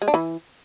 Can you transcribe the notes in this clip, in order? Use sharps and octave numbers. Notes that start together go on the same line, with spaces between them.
G#3
D4
E3